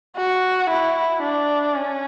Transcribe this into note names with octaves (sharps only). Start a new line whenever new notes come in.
F#4
E4
D4
C#4